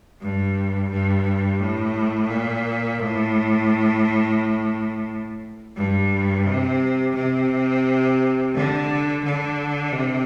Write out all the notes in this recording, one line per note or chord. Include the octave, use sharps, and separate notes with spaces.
G2
G2
A2
A#2
A2
G2
C3
C3
D3
D3
C3